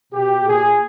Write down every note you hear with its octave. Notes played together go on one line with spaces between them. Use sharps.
B2 G4
A#2 G#4